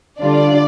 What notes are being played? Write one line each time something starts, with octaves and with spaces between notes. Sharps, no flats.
D3 G3 D4 F4 D5